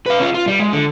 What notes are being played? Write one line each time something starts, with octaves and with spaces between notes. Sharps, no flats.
B4 F5
C#4 F4
F4
G3
G#3
D3